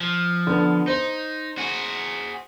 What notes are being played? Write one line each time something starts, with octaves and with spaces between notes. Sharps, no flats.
F3
D3 B3
D#4 C5
F#4 G#4